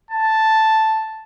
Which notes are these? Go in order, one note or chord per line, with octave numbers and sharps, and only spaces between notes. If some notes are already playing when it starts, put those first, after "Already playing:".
A5